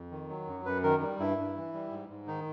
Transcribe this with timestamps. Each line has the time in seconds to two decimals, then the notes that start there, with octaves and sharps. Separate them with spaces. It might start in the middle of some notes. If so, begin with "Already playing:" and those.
Already playing: F2
0.11 D#3
0.29 F#3
0.47 F#2
0.65 F#2 B4
0.83 D#3 A#4
1.02 G3
1.20 G2 E4
1.38 G2
1.56 E3
1.74 G3
1.91 G#2
2.10 G#2
2.27 D#3 D#4